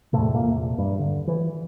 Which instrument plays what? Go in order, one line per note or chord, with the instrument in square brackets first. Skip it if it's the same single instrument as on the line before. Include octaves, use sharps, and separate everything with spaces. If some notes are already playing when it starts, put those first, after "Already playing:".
[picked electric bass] E2 A2 C3 A3
A#2 A#3
G2 G3
D3
E3